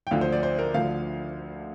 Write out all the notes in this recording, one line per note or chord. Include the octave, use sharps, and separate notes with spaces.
G5
D2 D3 F3 F5
C5
D5
C5
A#4
D2 D3 F3 F5